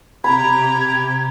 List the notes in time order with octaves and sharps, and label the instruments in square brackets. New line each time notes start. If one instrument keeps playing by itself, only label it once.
[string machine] C3 G4 [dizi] A#5 [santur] B5 [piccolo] G#6